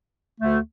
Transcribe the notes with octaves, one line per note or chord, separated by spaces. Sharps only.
D2 D3 A3